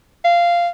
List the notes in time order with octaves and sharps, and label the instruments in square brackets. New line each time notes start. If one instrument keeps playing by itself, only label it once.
[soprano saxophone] F5